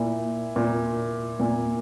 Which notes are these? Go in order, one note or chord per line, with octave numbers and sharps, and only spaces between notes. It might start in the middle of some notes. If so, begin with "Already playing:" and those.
Already playing: A#2 E4
A#2
A#2